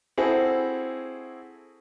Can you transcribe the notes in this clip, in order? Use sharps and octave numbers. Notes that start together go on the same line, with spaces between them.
C4 E4 F#4 G#4 A4